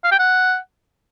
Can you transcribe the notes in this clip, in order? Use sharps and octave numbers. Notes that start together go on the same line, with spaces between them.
F5
G5
F#5